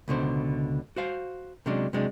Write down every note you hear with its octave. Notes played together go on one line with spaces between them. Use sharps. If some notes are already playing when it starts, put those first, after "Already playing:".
C#2 B2 D3 C5
F#4 C5 F5
C3 F#3 G#3 C#4 D4
C3 F#3 G#3 D4